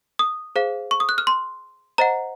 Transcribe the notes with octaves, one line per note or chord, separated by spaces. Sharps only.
D#6
G#4 C5 F5
C#6
D#6
F#6
F6
C6
C5 D#5 F#5 A#5